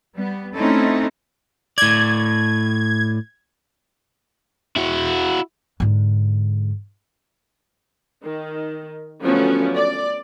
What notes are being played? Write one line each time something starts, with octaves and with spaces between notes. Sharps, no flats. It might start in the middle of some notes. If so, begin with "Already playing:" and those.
G3 B3
A3 C4 C#4 D#4 E4 A4
A2 D5 G#6
E4 F#4
G#2 D3
D#3
D3 F3 F#3 A3 B3 C#4
D5